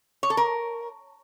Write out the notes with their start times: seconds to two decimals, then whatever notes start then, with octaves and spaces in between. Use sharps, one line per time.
0.23 C#5
0.30 A4
0.37 A#4